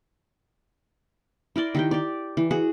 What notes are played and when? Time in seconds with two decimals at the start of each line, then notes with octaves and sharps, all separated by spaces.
1.56 E4 A#4 D5 C6
1.75 D#3 G4 G5
1.91 G4 D5
2.37 E3
2.51 F#4 G#4